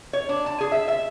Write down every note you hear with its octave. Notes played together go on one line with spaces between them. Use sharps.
C#5
D4
A5
G#4
E5
E5